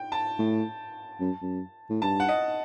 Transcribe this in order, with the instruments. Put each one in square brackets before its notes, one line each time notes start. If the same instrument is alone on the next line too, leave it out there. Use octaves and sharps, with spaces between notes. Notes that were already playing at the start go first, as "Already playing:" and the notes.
Already playing: [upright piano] G5
A5
[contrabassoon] A2
F#2
F#2
A2
[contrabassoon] G2 [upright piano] A5
[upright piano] F#5
D#5